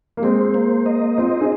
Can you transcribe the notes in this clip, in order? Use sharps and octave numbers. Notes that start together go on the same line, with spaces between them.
A#3
G#3 C4 C5
A#3
D#5
C4 F4 C5
D#4 G#4